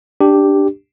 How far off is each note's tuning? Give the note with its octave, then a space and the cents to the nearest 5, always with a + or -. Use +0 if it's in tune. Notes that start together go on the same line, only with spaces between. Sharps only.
D4 +0 G4 +0